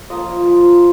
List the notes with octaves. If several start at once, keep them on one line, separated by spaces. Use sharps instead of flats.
F3 A#3 F4 D#5
F3 A#3 F4